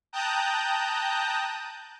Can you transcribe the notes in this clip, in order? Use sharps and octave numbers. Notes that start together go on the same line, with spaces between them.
G5 A5 A#5 D#6 F#6 G6